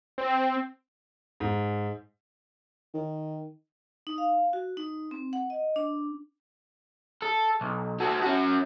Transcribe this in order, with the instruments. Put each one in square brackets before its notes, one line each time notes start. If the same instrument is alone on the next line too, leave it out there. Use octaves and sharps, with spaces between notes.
[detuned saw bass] C4
[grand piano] G#2
[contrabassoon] D#3
[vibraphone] D#4
F5
F#4
D#4
C4
F#5
D#5
D4
[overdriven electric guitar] A4
B1
F#4 A4
C#4 F#4